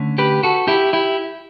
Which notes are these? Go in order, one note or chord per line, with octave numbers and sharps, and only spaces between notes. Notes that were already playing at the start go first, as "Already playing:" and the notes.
Already playing: D3 A3 C#4
G4 B4
F#4 A4
E4 G4
E4 G4